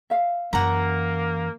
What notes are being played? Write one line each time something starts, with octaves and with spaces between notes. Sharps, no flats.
E5 F5
F#2 E3 A#3 F#5 A#5